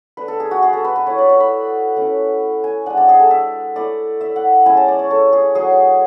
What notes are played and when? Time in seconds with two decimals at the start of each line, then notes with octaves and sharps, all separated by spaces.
0.17 A3 D4 B4
0.28 A4
0.40 G#4
0.51 F#4
0.62 G#4
0.73 A4
0.85 B4
0.96 B4
1.07 A3 E4 C#5
1.18 D5
1.29 E5
1.40 B5
1.96 A3 C#4 E4
2.64 G#5
2.86 G#3 D4 F#5
2.97 D5
3.09 G#4
3.20 A4
3.31 E5
3.76 A3 E4 D5
4.21 E5
4.36 F#5
4.65 G#3 C#4 E4 G#5
4.77 A5
4.88 D5
4.99 C#5
5.11 A4
5.33 G#4
5.55 F#3 A3 D4 G#4